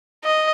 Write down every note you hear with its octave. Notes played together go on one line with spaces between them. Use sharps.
D#5